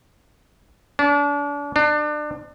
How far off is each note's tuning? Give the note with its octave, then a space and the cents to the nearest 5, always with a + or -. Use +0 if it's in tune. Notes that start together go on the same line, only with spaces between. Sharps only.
D4 -35
D4 +30